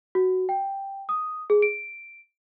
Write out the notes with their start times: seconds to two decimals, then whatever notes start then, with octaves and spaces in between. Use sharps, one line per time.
0.15 F#4
0.49 G5
1.09 D#6
1.50 G#4
1.62 D7